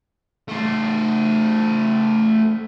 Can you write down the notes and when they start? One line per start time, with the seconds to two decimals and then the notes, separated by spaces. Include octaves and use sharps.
0.48 A3 C5